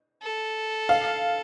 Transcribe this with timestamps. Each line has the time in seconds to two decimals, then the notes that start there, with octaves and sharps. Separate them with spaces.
0.23 A4
0.89 F5